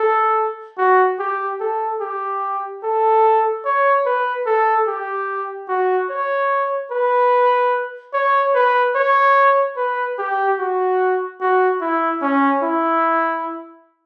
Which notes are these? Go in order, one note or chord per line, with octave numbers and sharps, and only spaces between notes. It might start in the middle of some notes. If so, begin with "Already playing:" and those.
Already playing: A4
F#4
G4
A4
G4
A4
C#5
B4
A4
G4
F#4
C#5
B4
C#5
B4
C#5
B4
G4
F#4
F#4
E4
C#4
E4